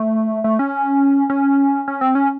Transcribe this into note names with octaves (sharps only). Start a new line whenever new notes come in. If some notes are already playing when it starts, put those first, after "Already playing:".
Already playing: A3
A3
C#4
C#4
C#4
C4
C#4